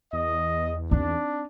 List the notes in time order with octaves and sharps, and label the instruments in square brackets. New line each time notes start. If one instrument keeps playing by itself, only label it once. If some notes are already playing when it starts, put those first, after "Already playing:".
[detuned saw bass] E2 [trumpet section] D#5
[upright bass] C4 D#4 [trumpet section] D4